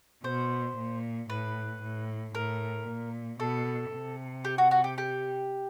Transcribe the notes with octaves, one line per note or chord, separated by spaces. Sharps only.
B2 C5
A#2
A2 B4
A2
A2 A#4
A#2
B2 A4
C3
G4
F#4
F#4
G4
G4